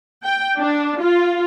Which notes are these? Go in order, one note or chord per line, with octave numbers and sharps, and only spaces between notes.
G5
D4
F4